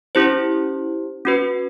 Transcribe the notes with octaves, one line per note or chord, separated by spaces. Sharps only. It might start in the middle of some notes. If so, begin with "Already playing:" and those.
C#4 E4 G4 C5
C#4 F#4 B4